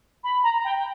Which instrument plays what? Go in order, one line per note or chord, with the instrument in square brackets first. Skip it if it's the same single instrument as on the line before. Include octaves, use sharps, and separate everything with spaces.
[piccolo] B5
A#5
G5